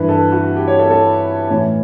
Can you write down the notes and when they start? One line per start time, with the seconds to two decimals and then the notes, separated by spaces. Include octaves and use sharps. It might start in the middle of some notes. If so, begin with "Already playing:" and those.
Already playing: G2 E3 B4
0.09 A4
0.32 F#4
0.56 G4
0.67 C#5
0.79 A4
0.91 A4
1.50 A2 E3 C#4